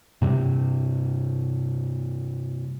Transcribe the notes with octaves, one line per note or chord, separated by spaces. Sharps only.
G2 C3 G3